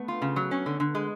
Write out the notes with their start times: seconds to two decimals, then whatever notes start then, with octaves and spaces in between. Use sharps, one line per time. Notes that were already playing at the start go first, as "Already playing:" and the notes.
Already playing: A3 B3
0.08 F4
0.22 C#3
0.36 F#3
0.51 C#4
0.66 D3
0.80 D3
0.95 G#3